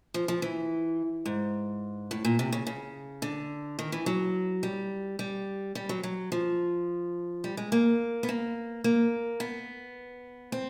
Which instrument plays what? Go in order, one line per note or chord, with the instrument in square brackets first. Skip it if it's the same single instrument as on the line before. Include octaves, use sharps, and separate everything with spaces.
[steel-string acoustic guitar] F3
F3
E3
G#2
A2
A#2
C3
C#3
C#3
D3
D#3
E3
F#3
G3
G3
G3
F#3
F#3
F3
G3
G#3
A#3
B3
A#3
A#3
B3
C4